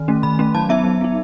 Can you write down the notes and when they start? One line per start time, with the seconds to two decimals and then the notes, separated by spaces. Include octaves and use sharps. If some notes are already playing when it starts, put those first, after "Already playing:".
Already playing: D#3
0.08 A3 C#4
0.23 D#3 B5
0.39 A3 C#4
0.55 F#3 A5
0.69 B3 D#4 E5
0.85 F#3
1.01 B3 D#4